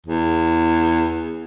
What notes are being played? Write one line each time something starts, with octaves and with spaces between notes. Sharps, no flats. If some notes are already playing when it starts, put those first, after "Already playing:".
E2